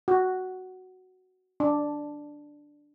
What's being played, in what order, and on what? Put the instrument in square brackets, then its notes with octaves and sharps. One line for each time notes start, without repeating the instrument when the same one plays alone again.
[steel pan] F#4
D4